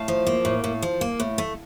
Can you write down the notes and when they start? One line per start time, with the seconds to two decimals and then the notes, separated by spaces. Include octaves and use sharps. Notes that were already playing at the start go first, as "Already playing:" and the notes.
Already playing: A2 F5 A5
0.08 F3
0.27 A#3
0.45 A2
0.64 A2
0.82 F3
1.01 A#3
1.20 A2
1.38 A3